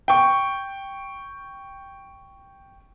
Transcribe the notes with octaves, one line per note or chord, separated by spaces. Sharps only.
G5 C#6